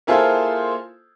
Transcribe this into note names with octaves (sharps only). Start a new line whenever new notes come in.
A#3 E4 F4 G#4 A4 C5